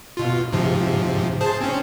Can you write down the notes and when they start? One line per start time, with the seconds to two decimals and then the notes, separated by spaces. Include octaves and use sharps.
0.17 B2 F4
0.53 G#2 C3 F3
1.41 G#4 C5 A5
1.61 C4 C#4